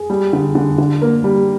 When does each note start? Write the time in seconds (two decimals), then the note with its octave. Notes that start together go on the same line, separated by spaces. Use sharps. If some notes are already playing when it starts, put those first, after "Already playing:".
Already playing: G#4
0.10 G3
0.33 D3
0.55 D3
0.78 D3
1.02 A#3
1.24 G3